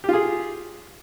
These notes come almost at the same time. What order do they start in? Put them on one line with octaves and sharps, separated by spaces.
G4 F4 G#4